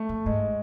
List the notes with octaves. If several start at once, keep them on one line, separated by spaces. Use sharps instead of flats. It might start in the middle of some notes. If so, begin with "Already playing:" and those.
Already playing: A3
A2
G#2 G#3